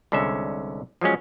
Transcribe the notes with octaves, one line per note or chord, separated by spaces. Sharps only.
C2 D3 G#3 C#4 E5
F3 F#3 G#3 C#4